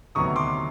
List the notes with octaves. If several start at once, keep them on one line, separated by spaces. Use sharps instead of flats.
D2 C3 D#3 F#3 B3 C#6 D#6
C6 D6